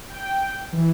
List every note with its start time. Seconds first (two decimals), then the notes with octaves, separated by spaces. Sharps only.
0.10 G5
0.73 E3